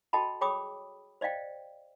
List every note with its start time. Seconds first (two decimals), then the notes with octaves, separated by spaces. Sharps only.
0.13 F#4 A4 D#5 G5 A5 B5
0.41 G#4 C#5 G5 B5 D6 D#6
1.21 C5 D5 D#5 F5 G5